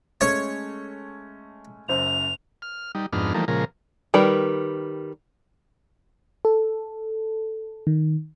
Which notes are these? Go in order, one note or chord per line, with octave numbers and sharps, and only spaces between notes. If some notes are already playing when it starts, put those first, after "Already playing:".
G#3 A3 C#4 C#5
F#1 F#2 C5 F7
F6
G3 D#4
F2 G#2 B3 D4 D#4 F6
E3 F3 G3 A3 A#3 D#4
A#2 C#3 F3 G#3 A#4
D#3 G3 A#4 B4
A4
D#3